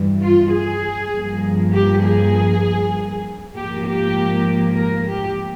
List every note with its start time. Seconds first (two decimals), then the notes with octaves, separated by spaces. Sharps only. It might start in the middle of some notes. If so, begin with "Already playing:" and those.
Already playing: G2 E3 G3
0.22 F4
0.52 G#4
1.13 G2 F3 A#3
1.73 G4
2.04 G#4
3.56 G#2 F3 A#3 G4
3.86 G4
4.77 A#4
5.08 G4